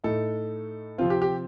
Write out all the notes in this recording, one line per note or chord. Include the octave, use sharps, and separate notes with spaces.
A2 A3 D#4 A4
C3 F3 C4 F4
G4
G4